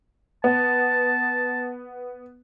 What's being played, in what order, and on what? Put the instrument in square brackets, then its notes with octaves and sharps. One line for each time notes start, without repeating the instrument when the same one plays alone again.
[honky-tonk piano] B3 [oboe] A5